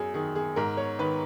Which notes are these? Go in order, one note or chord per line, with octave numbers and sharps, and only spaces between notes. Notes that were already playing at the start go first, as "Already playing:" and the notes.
Already playing: F#2 G#4
D#3 G#4
G#4
G#2 A#4
C#5
D#3 B4